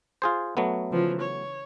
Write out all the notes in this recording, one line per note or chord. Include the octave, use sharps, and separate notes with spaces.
F4 G#4 C5
F#3 A3 B3
C#3 E3 F3
C#5